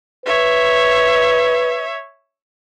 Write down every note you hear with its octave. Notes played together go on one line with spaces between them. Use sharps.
B4 C#5 E5